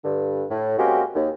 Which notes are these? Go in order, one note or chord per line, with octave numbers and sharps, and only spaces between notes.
G2 D3
A2
G#3 A#3 C4 C#4 F#4 G4
D#2